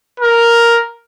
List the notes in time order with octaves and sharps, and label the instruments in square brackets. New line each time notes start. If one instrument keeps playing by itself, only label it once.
[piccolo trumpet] A#4